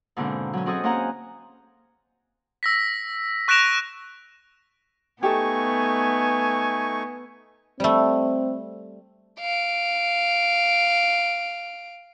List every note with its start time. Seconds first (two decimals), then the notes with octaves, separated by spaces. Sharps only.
0.16 G#2 B2 D3 A#3 C4
0.53 F#3 C#4
0.66 C4 C#4 F#4 G#4 A4 D#5
0.84 A#3 C4 C#4 G#4 F#5 A#5
2.63 E6 A#6 B6
3.48 C#6 F#6 A#6 D7 E7 F7
5.23 A3 B3 D#4 G4 A4 G#5 C#6
7.80 G3 A3 C4
9.40 F5 D7